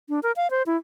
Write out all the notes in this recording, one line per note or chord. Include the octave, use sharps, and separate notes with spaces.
D4
A#4
F5
C5
E4